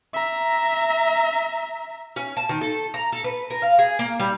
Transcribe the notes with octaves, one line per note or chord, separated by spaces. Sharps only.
E5 A#5
C#4
A5
D#3
A4
A#5
A4
B4
A#4
F5
G#4
A#3
G3